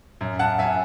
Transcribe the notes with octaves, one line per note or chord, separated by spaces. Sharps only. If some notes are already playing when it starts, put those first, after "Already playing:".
F#2
F#2 F#5 A5
F#2 E5 G#5